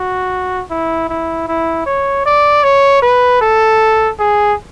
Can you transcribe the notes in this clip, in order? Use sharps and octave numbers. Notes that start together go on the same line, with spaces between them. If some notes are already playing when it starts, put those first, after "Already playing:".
Already playing: F#4
E4
E4
E4
C#5
D5
C#5
B4
A4
G#4